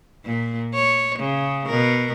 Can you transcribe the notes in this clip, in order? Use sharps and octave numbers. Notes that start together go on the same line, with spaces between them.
A#2
C#5
C#3
B2 A#4